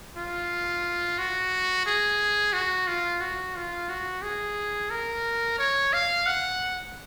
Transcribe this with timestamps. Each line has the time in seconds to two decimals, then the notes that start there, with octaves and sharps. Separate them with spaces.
0.17 F4
1.18 F#4
1.86 G#4
2.53 F#4
2.88 F4
3.21 F#4
3.56 F4
3.89 F#4
4.23 G#4
4.90 A#4
5.58 C#5
5.93 F5
6.26 F#5